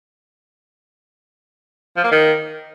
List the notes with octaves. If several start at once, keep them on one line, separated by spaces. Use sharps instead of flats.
F3
A#3
D#3